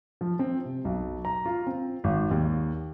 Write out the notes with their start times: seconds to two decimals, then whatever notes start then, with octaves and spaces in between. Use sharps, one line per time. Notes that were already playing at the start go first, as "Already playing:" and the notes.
0.21 F3
0.39 C4
0.65 C3
0.85 B1
1.25 A#5
1.46 F4
1.67 C4
2.04 G#1
2.31 D#2